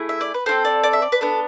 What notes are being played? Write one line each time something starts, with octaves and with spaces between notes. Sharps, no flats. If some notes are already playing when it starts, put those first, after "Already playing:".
Already playing: A3 E4 G#4
E5
D5
B4
C4 F4 A4 C5
D5
D5
E5
D5
B4
B3 D4 A4